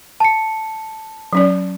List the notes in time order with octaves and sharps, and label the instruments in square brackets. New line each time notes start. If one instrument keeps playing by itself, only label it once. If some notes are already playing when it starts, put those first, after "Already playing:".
[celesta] A5 C#7
[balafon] F#3 C#4 D5